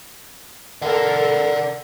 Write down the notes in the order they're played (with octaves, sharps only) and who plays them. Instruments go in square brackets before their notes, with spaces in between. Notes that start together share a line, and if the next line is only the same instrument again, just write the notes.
[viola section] A4 A#4 [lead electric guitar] D5 F#5